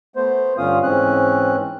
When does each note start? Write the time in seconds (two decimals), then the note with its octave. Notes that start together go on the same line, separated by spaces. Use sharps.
0.16 A3 B3 C5
0.58 G2 D3 C#4 F4 F5 D#6
0.83 G#2 E3 C4 C#4 F#6